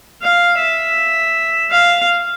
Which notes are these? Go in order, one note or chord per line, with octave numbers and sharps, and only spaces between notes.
F5
E5
F5